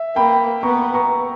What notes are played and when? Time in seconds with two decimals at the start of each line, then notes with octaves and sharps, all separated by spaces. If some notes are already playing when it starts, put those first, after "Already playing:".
Already playing: E5
0.16 A#3 G5 B5
0.63 B3 A#5 C#6
0.94 A#5 C#6